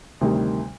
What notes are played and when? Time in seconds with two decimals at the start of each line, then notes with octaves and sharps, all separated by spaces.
0.21 D2 C3 D#3 G3